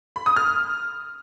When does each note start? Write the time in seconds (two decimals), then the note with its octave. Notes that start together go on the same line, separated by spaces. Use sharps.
0.16 B5
0.26 D#6
0.36 F6